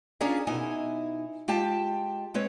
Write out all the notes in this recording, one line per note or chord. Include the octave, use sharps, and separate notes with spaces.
C#4 D4 F4 G#4 A#4 D5
B2 D#4 E4 G#5
G#3 F4 G4 G5 A5
G#3 C4 B4 C#5